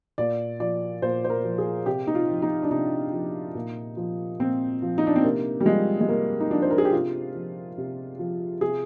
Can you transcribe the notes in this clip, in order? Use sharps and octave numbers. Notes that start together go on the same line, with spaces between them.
A#2 D5
F3 D5
A#2 C5
C5
A#4
F3
G#4
C3 G4
D#4
F4
F3
D#4
D4
C3 D#4
F3
A#2
F3
A#2 C4
F3
D#4
D4
C4
C3 A#3
G3
F3 G#3
G#3
C3 A#3
D#4
F3 D4
C5
A#4
G#4
G4
C3 F4
F3
C3
F3
C3 G#4